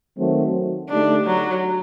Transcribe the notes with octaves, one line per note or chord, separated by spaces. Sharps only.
D#3 F#3 A3 C4
D3 A3 D4 D#4 G4
F#3